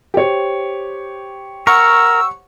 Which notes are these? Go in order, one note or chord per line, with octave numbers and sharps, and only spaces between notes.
G4 C5 C#5
A#4 F#5 C#6 E6